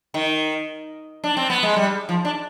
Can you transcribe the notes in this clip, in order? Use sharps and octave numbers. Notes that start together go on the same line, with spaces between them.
D#3
D4
C4
B3
G#3
G3
F3
D4